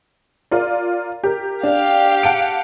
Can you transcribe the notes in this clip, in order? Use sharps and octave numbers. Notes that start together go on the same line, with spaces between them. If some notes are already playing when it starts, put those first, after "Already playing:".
F4 A#4 D5
G4 A#4
D4 G4 F5
F#5 A5 D7